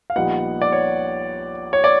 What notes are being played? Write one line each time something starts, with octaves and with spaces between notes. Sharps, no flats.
F5
A#1 A#2 G3 B3 D#4 F#5
D5
C#5
C#5
D5